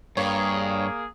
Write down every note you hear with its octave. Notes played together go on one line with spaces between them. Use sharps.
G2 A#3 G#4 C#5